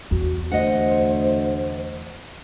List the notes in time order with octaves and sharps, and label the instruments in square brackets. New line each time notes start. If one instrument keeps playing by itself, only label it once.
[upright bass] E2 [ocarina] F#4
[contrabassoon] D2 [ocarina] C5 [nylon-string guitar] D#5 F#5